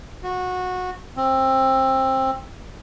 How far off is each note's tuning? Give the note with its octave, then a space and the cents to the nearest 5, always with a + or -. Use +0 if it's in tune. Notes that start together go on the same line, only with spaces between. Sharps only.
F#4 -20
C4 +20